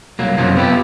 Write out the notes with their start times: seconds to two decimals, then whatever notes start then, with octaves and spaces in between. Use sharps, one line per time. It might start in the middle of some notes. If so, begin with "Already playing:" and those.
0.19 C2 F#3 A#3
0.38 F#2 C3 F3 F#3 A#3
0.57 B3 E4 F4 G4